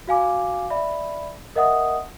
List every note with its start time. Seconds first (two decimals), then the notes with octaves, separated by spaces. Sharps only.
0.07 F#4 F5 G#5 D6
0.70 D5 E5 B5
1.56 A#4 D#5 E5 F#5 D#6